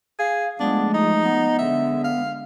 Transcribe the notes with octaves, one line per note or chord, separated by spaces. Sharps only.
G#4 F5
F3 G#3 A3 B3 D4
D#4 D#6
B3
D3 G#3 E5
F5